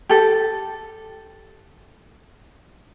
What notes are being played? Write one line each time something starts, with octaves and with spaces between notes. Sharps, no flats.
G4 A4